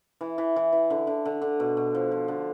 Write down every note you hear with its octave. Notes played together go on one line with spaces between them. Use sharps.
E3
E3
E3
E3
D3
D3
D3
D3
B2
B2
F3
F3
D3